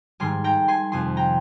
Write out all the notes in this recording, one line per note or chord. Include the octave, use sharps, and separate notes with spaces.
G#2 D#3 G3 G#5 C6
G5 A#5
G#5 C6
F2 C3 F3 G#5 C6
G5 A#5